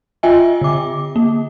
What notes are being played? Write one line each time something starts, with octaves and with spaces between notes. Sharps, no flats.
F4 D#5 E5 G5 G#5
D3 D6
A#3